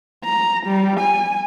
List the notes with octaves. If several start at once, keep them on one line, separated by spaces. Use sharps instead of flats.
A#5
G3
G#5